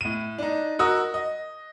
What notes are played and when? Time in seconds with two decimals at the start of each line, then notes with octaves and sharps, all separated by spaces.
0.01 A2 D#7
0.38 D4 D#4
0.79 F#4 A#4 D#5 D#6 E6
1.14 D#5